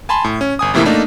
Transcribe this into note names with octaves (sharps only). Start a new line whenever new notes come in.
G#5 A5 B5 C6
A2
C#4
G1 G#5 D#6
F2 A2 C3 E3 A#3 E4
A3 A#3 D4 D#4